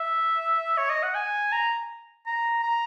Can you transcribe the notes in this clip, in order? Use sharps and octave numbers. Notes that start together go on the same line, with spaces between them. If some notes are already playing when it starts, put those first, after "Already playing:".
Already playing: E5
C#5
D#5
F#5
G#5
A#5
A#5
A#5